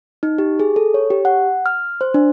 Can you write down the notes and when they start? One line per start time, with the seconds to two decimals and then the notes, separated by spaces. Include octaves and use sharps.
0.23 D#4
0.38 G4
0.60 G#4
0.76 A4
0.94 C#5
1.10 G4
1.25 F#5
1.66 F6
2.01 C5
2.14 D4